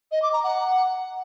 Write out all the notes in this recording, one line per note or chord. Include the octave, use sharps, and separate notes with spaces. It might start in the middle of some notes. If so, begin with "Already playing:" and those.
D#5
D6
A#5
F#5